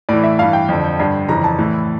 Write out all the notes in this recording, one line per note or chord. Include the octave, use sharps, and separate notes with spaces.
A2 E3 D5
E5
G2 E3 F5
G5
F2 D3
G2 D3
F2 C#3 E3 A#5
A5
A2 E3